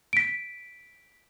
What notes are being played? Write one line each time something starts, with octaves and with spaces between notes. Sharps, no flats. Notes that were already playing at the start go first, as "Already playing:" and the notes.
B6 D7